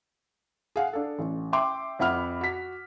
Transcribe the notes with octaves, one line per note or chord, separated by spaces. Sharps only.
G#4 F5 F#5
D4 A4
A1
E5 G5 C6 D6
F2 E5 F#5 B5 F6
F#4 B6